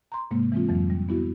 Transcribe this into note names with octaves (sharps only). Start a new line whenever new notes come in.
A#5 C6
G#2 C3 G#3 A#3
E3 G#3 C4 F4
F2 E3 F#3
G3
B3 E4 F#4